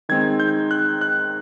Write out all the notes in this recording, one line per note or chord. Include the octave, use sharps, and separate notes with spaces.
D#3 G#3 C4 D#4 G#6
G6
F#6
F#6